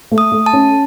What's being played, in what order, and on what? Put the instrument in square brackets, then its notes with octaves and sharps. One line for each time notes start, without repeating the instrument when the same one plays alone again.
[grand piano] A3
[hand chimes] D#6
[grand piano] A3
[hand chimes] A5
[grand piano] C#4